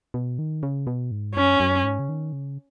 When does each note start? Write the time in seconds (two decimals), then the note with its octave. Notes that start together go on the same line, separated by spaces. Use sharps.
0.14 B2
0.39 D#3
0.63 C#3
0.87 B2
1.11 G#2
1.35 F#2 C#4
1.60 F#2
1.84 G#2
1.99 C#3
2.09 D#3
2.33 C#3